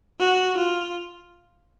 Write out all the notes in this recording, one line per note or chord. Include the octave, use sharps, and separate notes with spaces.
F#4
F4